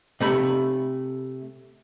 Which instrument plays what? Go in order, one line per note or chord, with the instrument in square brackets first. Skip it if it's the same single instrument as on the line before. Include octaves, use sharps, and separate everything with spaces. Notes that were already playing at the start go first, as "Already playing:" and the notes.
[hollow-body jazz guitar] C3 A3 B5